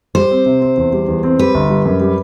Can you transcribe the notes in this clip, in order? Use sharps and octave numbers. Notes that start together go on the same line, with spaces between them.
G3 C5
C4
C3
C4
E2
G3
E2
C4
G3 B4
G1
G3
F#2
G3